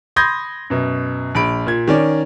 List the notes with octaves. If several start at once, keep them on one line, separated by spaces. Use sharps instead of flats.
B5 C6 D#6 G6 G#6 A#6
F#2 B2
A#1 B5 D7
A#2 G#6
D#3 C#4 D5